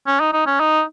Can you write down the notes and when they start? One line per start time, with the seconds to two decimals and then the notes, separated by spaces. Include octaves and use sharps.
0.07 C#4
0.20 D#4
0.33 D#4
0.46 C#4
0.60 D#4